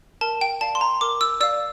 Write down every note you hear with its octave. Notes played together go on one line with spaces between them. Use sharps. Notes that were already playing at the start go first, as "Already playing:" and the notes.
A#4 A5
G5
D5 F5 A5
C6
A#5
A#4 D6
E6
D5 F5 E6